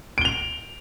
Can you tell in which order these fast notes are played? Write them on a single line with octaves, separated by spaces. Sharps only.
D7 G7 F7